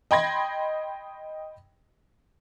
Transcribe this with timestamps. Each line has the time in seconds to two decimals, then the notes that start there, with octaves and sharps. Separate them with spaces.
0.11 D#5 G5 B5 C6 G#6 A#6